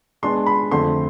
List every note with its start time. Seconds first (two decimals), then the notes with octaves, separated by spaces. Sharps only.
0.22 B2 G#3 B3 D4 C6
0.46 B5
0.71 F2 D3 A3 C4 C6